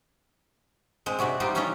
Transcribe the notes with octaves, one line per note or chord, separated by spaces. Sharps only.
G#3 C4
C3 F#4 D5 E5
G3 D#4 F4 G4 C5
C#4 E4 F4 B4 C#5 D#5